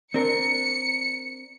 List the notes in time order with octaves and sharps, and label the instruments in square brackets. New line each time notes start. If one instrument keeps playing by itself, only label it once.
[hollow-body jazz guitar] C4 D4 A#4 [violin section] C#7